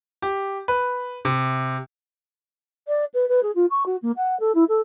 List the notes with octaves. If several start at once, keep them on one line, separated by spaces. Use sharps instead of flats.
G4
B4
C3
D5
B4
B4
G#4
F4
C#6
F#4
A#3
F#5
A4
E4
A4